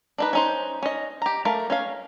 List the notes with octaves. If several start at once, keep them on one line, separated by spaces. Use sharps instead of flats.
D4 D#4 B4
C#4 D#4 C5
C#4 D#5
G4 A#5
A3 A#4 F5
C#4 C#5 F5